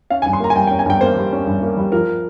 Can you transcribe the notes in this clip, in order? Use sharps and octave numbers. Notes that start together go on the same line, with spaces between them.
C#4 F5
G#5
G2
C6
A#3 A#5
G#5
G3 G5
G5
C#4
G#5
G2 G5
A#3 C5
G3
C#4
G2
A#3
G3
F3 A#4